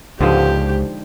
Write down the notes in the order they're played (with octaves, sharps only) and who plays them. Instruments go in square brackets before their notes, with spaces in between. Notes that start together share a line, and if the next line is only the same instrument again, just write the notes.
[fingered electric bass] C#2 [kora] G#2 D3 F3 [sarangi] G4